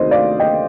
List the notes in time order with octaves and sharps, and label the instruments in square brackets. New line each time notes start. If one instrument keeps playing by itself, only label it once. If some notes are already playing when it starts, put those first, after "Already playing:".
Already playing: [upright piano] D2 C3 D#3 C5 D#5
D5 F5
D#5 G5